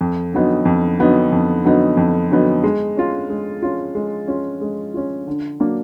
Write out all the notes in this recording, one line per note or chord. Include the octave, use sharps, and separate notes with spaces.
F2
D3 F#3 B3 D#4
F2
D3 F#3 B3 D#4
F2
D3 F#3 B3 D#4
F2
D3 F#3 B3 D#4
G#3
C#4 F4
G#3
C#4 F4
G#3
C#4 F4
G#3
C#4 F4
D3
F#3 A#3 D4